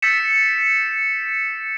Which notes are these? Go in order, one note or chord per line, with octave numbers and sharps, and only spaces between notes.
E6 G6 A6 B6 C#7 E7